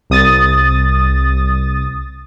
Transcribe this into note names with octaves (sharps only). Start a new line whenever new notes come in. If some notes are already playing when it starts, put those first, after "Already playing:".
C2 D#6 A6